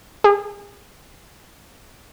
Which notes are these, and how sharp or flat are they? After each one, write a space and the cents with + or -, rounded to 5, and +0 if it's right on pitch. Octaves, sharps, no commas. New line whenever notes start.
G#4 -40